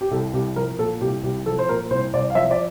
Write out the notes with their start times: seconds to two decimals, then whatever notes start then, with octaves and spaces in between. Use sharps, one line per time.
0.01 G4
0.11 C2 A4
0.33 C2 G4
0.56 F3 A#4
0.79 A#2 A4
1.01 C2 G4
1.24 C2 G4
1.46 F3 A4
1.59 C5
1.69 A#2 A#4
1.90 C2 C5
2.14 C2 D5
2.30 F5
2.35 F3 E5
2.51 D5